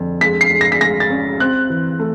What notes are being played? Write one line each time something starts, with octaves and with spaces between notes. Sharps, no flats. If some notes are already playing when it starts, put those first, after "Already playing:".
Already playing: F2 D3
G#3 B6
C7
G#3
A#6
B6
G#3 A#6
A6
C#4
C4 F#6
E3
A3